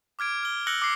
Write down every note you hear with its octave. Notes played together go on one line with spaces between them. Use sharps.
D6 F6 G#6 D7
F6 G7
E6 F#6 A#6 C#7 F#7 G7
D6 C7 C#7